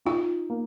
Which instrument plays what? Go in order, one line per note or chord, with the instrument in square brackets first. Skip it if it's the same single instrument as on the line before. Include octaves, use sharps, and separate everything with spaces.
[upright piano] D#4 [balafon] F4
[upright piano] A#3